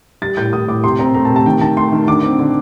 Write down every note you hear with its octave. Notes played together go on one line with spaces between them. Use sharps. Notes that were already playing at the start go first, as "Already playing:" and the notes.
G3 A6
A2 G6
A2 D#6
A2 D6
C3 C6
C4 A#5
A3 A#5
A5
C3
A5
D#3 G5
D#3 A5
A3 C6
D#3
D3 D6
C4
D3